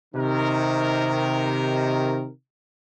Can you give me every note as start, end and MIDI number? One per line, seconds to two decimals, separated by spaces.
0.15 2.28 48
0.15 2.28 51
0.15 2.28 63
0.15 2.28 70